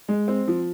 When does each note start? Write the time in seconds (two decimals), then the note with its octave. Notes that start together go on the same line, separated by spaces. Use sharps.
0.08 G#3
0.28 C4
0.48 F3